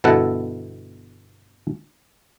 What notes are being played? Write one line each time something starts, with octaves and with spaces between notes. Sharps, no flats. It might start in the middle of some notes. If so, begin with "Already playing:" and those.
G1 B2 E4 A4 F#5